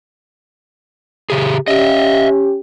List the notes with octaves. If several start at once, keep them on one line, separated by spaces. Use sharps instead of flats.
C#3 G4 G#4
C#4 G4 D#5 E5